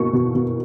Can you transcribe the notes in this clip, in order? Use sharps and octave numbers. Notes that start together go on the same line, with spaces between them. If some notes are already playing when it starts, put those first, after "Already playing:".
Already playing: B2 A#3 C#6
B2
B2